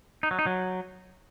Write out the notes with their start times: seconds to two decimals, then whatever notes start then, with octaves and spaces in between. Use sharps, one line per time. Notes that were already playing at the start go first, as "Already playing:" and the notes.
0.23 D#4
0.31 F#3
0.39 D#4
0.46 F#3